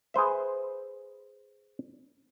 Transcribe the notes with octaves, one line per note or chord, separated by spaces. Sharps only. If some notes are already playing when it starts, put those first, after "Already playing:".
G#4 B4 C5 E5